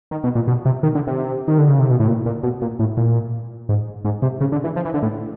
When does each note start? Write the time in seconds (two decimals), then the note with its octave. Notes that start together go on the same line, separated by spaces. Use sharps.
0.11 D#3
0.24 B2
0.35 A#2
0.48 B2
0.65 C3
0.83 D#3
0.95 D3
1.07 C3
1.48 D#3
1.58 D3
1.69 C#3
1.79 C3
1.90 B2
2.00 A2
2.08 A#2
2.26 A#2
2.43 B2
2.62 A#2
2.79 A2
2.97 A#2
3.69 G#2
4.05 G#2
4.22 C3
4.41 C#3
4.52 D3
4.64 E3
4.76 F3
4.85 E3
4.94 D3
5.03 A2